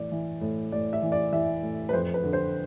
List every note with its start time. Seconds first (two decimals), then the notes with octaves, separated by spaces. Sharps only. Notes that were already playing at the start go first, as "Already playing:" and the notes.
Already playing: A2 E3 D5
0.12 E3
0.41 A2
0.72 A2 D5
0.93 E5
1.02 E3
1.12 D5
1.32 E3 E5
1.62 A2
1.89 B4
1.93 F2 C5
2.14 B4
2.24 D3
2.33 C5